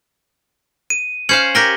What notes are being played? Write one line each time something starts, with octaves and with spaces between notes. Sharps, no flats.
D#7
C#4 C5 F5 G#6 C#7 F#7
G4 A#4 G5 A#6 G7